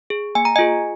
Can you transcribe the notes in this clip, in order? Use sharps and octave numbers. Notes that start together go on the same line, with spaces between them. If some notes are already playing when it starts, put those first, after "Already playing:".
G#4
A#3 G#5
A#5
F4 G#4 D#5 G#5